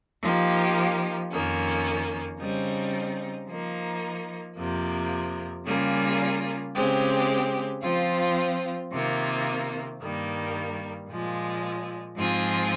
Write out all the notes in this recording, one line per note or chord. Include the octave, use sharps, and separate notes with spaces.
F3 A#3 D#4 G4
F2 D#3 A#3 C#4
C#3 G3 C4 D#4
F3 A#3 D#4
F2 C3 F3 A#3
C#3 G3 A#3 F4 G#4
C#3 G#3 C4 G4
F3 C4 F4
C3 D#3 A#3 F4
G2 D#3 G3 A#3
A#2 F3 G#3
G#2 F3 C4 F4 G#4